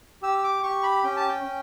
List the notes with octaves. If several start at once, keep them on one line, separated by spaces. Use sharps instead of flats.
G4 E6
E6
D6
G4 C#6
B5
C#4 G5
A5
G5
C#4